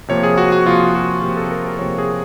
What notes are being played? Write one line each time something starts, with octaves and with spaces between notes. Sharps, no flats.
C3 F3 A#3 C#5
G#4
F#4
F#4
C3 F3 A#3 F4
F#4
C3 F3 A#3 G4
A4
A#4
A#4
C3 F3 A#3 C#5
G#4